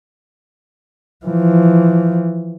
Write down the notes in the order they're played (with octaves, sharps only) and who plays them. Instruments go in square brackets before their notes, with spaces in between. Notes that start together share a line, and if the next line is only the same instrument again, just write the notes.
[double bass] E3 F3